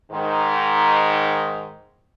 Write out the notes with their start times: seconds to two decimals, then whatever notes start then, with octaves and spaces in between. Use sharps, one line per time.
0.12 G#2 D#3